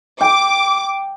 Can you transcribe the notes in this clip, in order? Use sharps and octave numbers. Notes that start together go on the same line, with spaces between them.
G5 D6